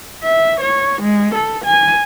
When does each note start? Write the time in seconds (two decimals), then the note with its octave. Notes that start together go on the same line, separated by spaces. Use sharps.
0.24 E5
0.61 C#5
1.02 G#3
1.35 A4
1.65 G#5